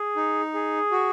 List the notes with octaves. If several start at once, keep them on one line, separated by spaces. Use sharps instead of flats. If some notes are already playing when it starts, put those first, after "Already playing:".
Already playing: G#4
D#4
G#4
F#4